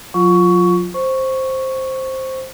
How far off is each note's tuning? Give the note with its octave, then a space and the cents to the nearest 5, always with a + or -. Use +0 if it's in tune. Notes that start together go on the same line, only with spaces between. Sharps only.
F#3 -40 F4 +0 C#6 +15
C5 +5 C#6 +0